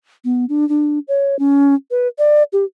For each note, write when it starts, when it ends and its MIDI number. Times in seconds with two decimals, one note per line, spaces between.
0.25 0.45 59
0.49 0.67 62
0.69 0.99 62
1.08 1.38 73
1.39 1.74 61
1.91 2.08 71
2.19 2.43 74
2.53 2.64 67